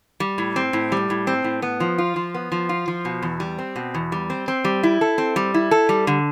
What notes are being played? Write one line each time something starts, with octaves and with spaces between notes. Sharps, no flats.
G3
A2
C4
A2
G3
A2
C4
A2
B3
F3
F4
F3
B3
F3
F4
F3
B2
E2
G3
C4
B2
E2
G3
C4
C4
G3
E4
A4
C4
G3
E4
A4
G3
D3